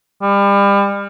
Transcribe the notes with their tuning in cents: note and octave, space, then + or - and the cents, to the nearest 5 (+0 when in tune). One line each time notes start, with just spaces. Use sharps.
G3 +35